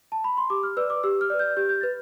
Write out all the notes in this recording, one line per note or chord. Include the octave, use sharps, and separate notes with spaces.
A5
B5
C6
G4 D6
F6
B4 D5 E6
D6
G4 E6
F6
B4 D5
G6
G4 G6
G6
B4 A6